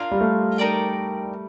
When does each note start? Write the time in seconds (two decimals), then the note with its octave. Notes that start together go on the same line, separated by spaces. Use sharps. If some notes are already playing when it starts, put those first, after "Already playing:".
Already playing: D4 F4 A#4 F5
0.11 G3
0.21 A3
0.58 D#4 A#4 D5 G5